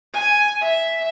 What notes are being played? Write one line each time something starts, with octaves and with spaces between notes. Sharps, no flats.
G#5
E5